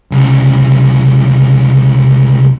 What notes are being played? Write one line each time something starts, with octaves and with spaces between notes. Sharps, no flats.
C2 C#3